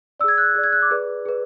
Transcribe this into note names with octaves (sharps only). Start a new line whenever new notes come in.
G#4 D5 E6 G#6
F#6
G#4 D5
G#6
F#6
D6
G#4 B4 D5
G#4 B4